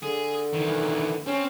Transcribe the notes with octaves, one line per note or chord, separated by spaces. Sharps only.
D3 G#4
D#3 E3
C4 C#4